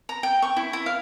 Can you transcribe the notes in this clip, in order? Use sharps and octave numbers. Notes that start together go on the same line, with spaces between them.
A#5
G5
C#6
E4
E4
F5